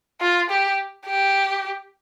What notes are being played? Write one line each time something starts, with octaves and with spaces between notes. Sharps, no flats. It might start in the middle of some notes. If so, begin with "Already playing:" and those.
F4
G4
G4